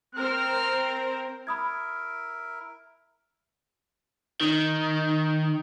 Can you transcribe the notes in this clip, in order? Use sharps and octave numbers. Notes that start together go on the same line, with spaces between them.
C4 A#4 C5 F6
E4 A#4 B5 D#6 G#6
D#3